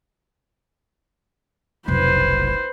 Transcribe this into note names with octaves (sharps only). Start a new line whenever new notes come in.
F1 B1 B4 C5